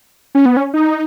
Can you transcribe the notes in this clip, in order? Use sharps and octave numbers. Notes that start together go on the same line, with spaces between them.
C#4
B3
C#4
D#4